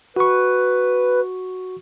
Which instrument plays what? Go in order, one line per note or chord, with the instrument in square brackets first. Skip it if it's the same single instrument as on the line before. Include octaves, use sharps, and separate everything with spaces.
[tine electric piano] F#4 C#6 [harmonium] B4